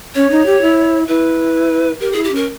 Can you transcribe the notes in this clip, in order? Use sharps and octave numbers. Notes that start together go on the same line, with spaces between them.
C#4 C#5
D#4
G4
E4
E4 B4
G4 A#4
E4 G#4
G4
C#4 A#4